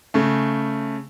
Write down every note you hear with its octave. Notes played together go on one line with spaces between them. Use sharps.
C#3 A3